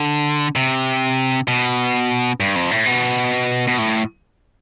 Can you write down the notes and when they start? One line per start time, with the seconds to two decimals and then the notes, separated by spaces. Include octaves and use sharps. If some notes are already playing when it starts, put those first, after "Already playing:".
Already playing: D3
0.56 C3
1.48 B2
2.40 G2
2.55 F2
2.71 A2
2.86 B2
3.67 B2
3.78 A2